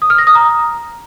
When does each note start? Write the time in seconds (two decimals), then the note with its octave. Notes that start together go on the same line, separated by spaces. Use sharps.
0.02 D#6
0.10 F6
0.18 A#6
0.27 D#6
0.35 A#5